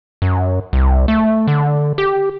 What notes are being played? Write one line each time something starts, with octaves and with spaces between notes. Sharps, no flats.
F#2
C2
A3
D3
G4